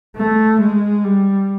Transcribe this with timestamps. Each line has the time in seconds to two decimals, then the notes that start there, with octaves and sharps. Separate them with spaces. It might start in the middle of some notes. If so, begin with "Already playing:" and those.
0.17 A3
0.60 G#3
1.03 G3